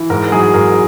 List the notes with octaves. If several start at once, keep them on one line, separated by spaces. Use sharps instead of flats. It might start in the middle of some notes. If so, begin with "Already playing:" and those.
Already playing: E3
G#2 A#4
F#3 G#4
G#2 A#4